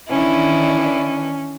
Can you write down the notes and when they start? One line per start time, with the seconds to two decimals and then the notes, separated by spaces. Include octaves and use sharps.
0.10 D#3 E3 C#4 D4 E4